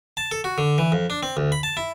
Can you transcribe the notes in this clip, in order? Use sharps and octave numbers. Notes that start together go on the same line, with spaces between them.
A5
A4
F#4
D3
E3
F2
D4
C4
D2
B5
A5
E4